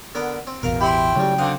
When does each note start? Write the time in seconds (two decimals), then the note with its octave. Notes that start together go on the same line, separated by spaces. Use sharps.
0.15 D3 B3 A#4
0.47 C4
0.63 A1 E2 B2 A#4 F5 A#5
0.81 E4 G4 C5 G5 C6
1.16 A2 C#3 F#3 G3
1.38 D3 C4 D#5 F5 F#5